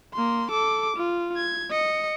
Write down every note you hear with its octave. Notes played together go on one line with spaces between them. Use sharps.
A#3 C6
A4 D6
F4
G#6
D#5 C#7